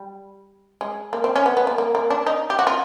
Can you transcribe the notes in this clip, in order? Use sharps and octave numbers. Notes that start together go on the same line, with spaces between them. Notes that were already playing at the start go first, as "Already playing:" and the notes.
Already playing: G3
G#3
A#3
C4
C#4
B3
B3
A#3
A#3
A#3
D4
D#4
G4
F#4
F4